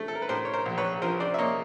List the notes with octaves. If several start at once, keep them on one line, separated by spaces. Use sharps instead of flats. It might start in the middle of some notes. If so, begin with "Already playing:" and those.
Already playing: A3
A4
A#4
B4
A2 A#4 C5
C#5
A#4 C5
A#1
B4 C#5
F3 A#4 C5
C5 D5
E5
A#3 C#5 D#5